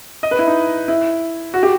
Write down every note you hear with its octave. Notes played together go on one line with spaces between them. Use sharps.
D#5
B4
E4
D#4
E4
F#4
G4